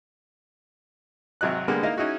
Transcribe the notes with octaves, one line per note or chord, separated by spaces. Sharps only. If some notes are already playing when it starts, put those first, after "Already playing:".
G#1 C3 F#3 D#5 F#6
D3 G3 G#3 A#3 B3
A#3 D#4 E4 D#5 F5
C#4 D#4 E4 F#4 G#4